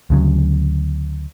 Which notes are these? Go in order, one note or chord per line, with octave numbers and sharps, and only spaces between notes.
D2 C#3 F#3